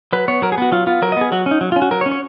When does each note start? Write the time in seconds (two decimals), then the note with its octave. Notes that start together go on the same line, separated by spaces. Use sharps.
0.13 F#3 B4
0.28 B3 C#5
0.42 F#3 A#4
0.52 G#4
0.58 B3 F#4
0.72 F#3 F4
0.87 B3 F4
1.02 F#3 A#4
1.12 D#5
1.17 B3 G#4
1.32 F#3 F#4
1.46 C#4
1.51 D#4
1.61 F#3
1.72 F4
1.76 C#4
1.82 F#4
1.91 F#3 A#4
2.01 C#5
2.06 C#4
2.11 C#5